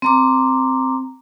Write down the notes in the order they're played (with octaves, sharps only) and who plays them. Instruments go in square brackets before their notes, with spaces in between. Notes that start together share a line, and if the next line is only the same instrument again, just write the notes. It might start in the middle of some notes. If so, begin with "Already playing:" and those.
[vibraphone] C4 A#5 D6